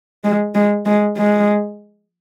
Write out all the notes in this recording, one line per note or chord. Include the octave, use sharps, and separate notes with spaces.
G#3
G#3
G#3
G#3